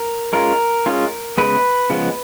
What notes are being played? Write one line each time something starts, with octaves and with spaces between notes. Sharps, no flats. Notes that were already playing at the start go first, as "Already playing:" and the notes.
Already playing: A#4
G#3 C#4 F4 A#4
G#3 C#4 F4
C#3 F3 G#3 B3 B4
C#3 F3 G#3 B3